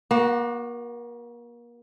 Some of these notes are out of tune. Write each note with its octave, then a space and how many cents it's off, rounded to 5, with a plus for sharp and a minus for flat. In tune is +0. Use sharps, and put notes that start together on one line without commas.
A#3 +35 F#4 +0